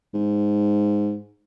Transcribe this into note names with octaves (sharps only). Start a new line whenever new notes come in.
G#2